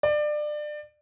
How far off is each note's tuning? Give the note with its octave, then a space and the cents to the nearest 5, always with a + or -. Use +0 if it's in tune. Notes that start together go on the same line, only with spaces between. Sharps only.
D5 +25